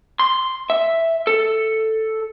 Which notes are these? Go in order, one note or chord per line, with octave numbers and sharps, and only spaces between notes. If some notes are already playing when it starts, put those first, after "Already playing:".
C6
E5
A4